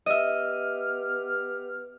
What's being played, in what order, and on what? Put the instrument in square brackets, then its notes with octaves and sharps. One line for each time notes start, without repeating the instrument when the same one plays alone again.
[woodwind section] B3 G4 F6 [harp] D#5 E5